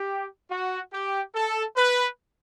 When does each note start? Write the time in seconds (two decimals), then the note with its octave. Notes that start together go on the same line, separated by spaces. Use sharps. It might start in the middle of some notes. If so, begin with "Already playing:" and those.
Already playing: G4
0.51 F#4
0.93 G4
1.35 A4
1.77 B4